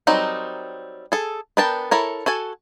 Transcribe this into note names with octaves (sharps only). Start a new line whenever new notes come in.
F#3 G3 C4 D#4 A#4
G#4 A4
B3 D4 A#4 G5 A5
E4 A4 A#4 C#5
F#4 A4 G#5 A5